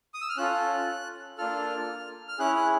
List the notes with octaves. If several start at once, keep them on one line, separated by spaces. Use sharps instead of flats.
D#6
E6
F6
C#4 F4 A4 F#6
A#3 D4 F4 A4 F6
F6
C#4 E4 G#4 F#6
F#6